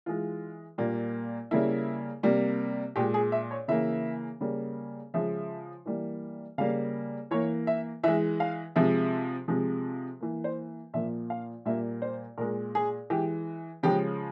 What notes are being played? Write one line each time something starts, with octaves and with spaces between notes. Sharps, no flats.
E3 G#3 F4
A#2 G3 A#3
C#3 G3 A#3 E4
C3 G3 A#3
A#2 G#3 G4
G#4
E5
C#5
C#3 E3 A#3 E5
C#3 G3 A#3
C#3 F3 G#3 E5
E3 G3 A#3
C#3 G3 A#3 F5
E3 A#3 C#5
E5
E3 G#3 E5
F5
C3 F3 G#3 E5
C3 F3 G#3
E3 A#3
C5
A#2 F3 A#3 E5
F5
A#2 G3 A#3 E5
C5
A#2 G#3 A#4
G#4
E3 G#3 G4
C#3 F3 G#3 G4